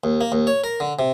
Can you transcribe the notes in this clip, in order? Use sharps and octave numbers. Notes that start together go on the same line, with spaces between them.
D#2
A#3
D#2
C#5
A#4
D3
C3